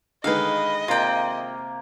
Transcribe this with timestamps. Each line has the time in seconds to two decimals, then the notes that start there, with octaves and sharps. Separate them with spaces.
0.24 D3 D#3 G#3 B4 D#5 F5
0.88 C3 A#3 F4 G5